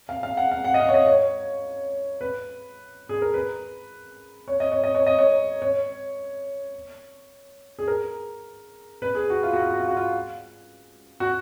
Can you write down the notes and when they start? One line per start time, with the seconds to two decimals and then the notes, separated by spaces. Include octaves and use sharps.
0.09 F5
0.23 F5
0.37 F#5
0.52 F5
0.65 F#5
0.74 D#5
0.80 F5
0.89 C#5
0.94 D#5
1.07 C#5
2.21 B4
3.09 G#4
3.22 A#4
3.34 B4
4.48 C#5
4.60 D#5
4.72 C#5
4.84 D#5
4.95 C#5
5.07 D#5
5.19 C#5
5.62 C#5
7.79 G#4
7.88 A#4
9.02 B4
9.15 G#4
9.30 F#4
9.43 F4
9.53 F#4
9.62 F4
9.71 F#4
9.80 F4
9.88 F#4
9.97 F4
11.20 F#4